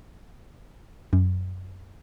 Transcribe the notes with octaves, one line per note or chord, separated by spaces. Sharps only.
F#2